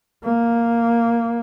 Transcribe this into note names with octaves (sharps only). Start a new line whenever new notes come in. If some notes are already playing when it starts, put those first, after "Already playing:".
A#3